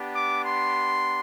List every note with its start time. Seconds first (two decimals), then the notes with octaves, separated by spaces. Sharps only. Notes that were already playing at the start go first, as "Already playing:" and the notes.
Already playing: B3 D4 G4
0.14 D6
0.44 C6